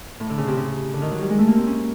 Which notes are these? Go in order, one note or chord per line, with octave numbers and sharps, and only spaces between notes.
A2
D3
C#3
C3
C#3
D3
D#3
F#3
G3
G#3
A3
A#3
C4
C#4